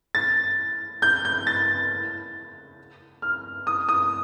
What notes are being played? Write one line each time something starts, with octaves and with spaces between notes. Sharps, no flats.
A6
G6
G6
A6
F6
D#6
D#6